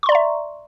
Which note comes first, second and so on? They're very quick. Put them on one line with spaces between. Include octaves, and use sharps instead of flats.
C#6 C6 D5 A#5 E5